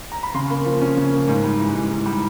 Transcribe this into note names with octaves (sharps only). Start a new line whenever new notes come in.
A#5
B5
C#3 C6
A#3
F3
C#4
C#3
A#3
G#2
G3
E3
G#2
G#2
G3